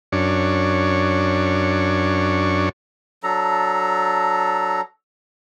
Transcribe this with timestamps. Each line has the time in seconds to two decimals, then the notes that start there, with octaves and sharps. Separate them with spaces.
0.12 F#2 D4 C#5
3.23 F#3 D4 A4 A#5